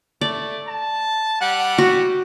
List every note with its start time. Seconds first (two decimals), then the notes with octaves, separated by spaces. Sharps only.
0.21 A3 D5
0.67 A5
1.41 G3 F#5
1.78 F#4